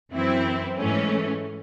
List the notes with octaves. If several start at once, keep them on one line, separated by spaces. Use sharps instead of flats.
F#2 E3 C4 E4
G#2 E3 A3 C#4